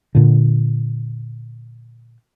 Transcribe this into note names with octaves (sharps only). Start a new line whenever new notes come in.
A#2 D3